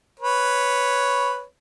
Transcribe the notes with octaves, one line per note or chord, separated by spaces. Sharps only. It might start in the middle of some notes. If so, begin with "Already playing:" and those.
B4 C#5